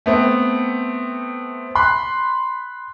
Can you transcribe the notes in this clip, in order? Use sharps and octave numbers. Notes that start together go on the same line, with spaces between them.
A3 B3 C4
B5 C6 F#6